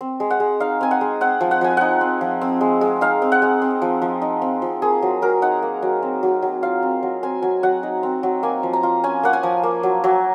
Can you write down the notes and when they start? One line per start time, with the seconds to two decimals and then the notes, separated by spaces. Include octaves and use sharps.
0.01 C4
0.20 G#3
0.30 F#5
0.40 G#3
0.60 D#4 F5
0.81 C4 G#5
0.91 F#5
1.01 G#3
1.21 C4 F#5
1.41 F3
1.51 F#5
1.61 F3 G#5
1.77 D#4 F#5
2.01 C4
2.21 F3
2.41 C4
2.61 G#3
2.81 G#3
3.01 D#4 F5
3.22 C4
3.32 F#5
3.42 G#3
3.62 C4
3.82 F3
4.02 F3
4.22 D#4
4.42 C4
4.62 F3
4.82 A#3 G#4
5.02 F#3
5.22 F#3 A#4
5.42 D#4 F#5
5.62 A#3
5.82 F#3
6.03 C4
6.23 F#3
6.42 F#3
6.63 F4 F5
6.83 C4
7.03 F#3
7.23 C4 G#5
7.42 F#3 G#5
7.63 F#3 F#5
7.83 D#4
8.03 C4
8.23 F#3
8.43 A#3 G#5
8.63 F3
8.73 A#5
8.83 F4
9.04 C#4 G#5
9.23 A#3 F#5
9.33 G#5
9.43 F3
9.63 A#3
9.83 F#3
10.04 F#3